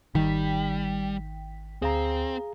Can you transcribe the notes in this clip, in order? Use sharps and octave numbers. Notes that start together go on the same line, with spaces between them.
G#1 D#3 G3 G5 B6
D2 C4 G#4 F5 A#5